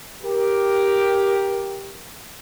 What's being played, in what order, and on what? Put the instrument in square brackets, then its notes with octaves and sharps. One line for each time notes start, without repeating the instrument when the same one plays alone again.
[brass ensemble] G4 A#4